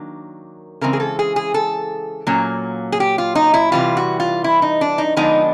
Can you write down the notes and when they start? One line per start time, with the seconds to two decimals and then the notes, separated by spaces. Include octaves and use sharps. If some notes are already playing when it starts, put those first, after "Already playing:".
Already playing: D#3 F#3 A#3 D4
0.81 C#3 E3 G#3 C4 A#4
0.93 G#4
1.00 A4
1.19 G#4
1.36 G#4
1.54 A4
2.27 A#2 F#3 A#3 C#4
2.92 G#4
3.00 G4
3.18 F4
3.35 D#4
3.54 E4
3.72 C3 E3 G3 F4
3.97 F#4
4.20 F4
4.44 E4
4.62 D#4
4.81 D4
4.98 D#4
5.16 D3 F3 G#3 B3 D4 D#4